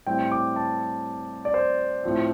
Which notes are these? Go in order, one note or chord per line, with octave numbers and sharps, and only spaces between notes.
A2 G3 C4 G5
D6
A5
D5
C5
A2 F3 C4